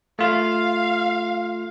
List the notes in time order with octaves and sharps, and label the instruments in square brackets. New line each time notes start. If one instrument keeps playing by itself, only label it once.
[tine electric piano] A3 F4 [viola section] F5